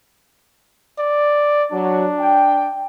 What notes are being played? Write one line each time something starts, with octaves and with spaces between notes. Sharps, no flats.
D5
F#3 D4
G5